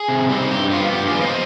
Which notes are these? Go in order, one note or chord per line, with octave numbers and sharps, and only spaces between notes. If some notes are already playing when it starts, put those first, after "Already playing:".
Already playing: G#4
C3
G3 C4 D#4
G2 G4
F3 B3 F4
G2 G4
F4 G#4
F3 B3 D5
C5 D#5